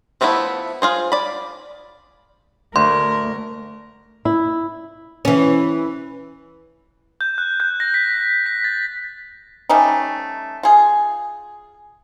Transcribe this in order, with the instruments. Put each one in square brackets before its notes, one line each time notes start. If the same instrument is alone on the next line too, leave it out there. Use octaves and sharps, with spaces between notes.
[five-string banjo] F3 A3 B3 D4 E4
F4 G#4 C5
D5 B5
[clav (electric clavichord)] D2 [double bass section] A3 [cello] A#4 [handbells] C6
[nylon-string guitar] E4
[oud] E3 C#4
[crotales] G6
F#6
G6
A#6
B6
B6
A6
[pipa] G3 A3 C#4 D#4
F4 G#4